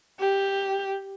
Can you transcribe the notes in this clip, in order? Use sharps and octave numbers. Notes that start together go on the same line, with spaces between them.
G4